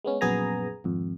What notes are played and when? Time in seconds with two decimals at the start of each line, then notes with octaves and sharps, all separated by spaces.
0.05 G#3 B3 C#4
0.21 A#1 F#2 B3 G#4 G#5 A#5
0.84 G#1 F2